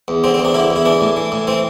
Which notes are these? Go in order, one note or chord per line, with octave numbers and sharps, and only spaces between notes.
E2
D3 C4
C4
E2
D4
D3 E4
E2
E4
E3 D4
A2
E3
A2
E3 C4